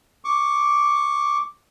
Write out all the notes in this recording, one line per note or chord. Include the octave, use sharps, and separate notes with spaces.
C#6 D6